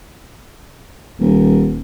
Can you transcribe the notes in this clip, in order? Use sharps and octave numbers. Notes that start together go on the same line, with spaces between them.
D#1